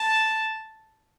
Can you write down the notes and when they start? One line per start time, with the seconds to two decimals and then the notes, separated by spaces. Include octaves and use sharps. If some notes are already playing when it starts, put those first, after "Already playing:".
Already playing: A5